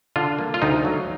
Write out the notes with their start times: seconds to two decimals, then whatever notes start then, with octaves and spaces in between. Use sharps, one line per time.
0.16 D3 F4
0.39 A#3
0.54 F4
0.62 D2 D#4
0.85 F#3